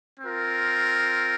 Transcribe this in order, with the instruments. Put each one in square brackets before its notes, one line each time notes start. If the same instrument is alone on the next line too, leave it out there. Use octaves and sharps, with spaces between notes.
[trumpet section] C4 F4 A#4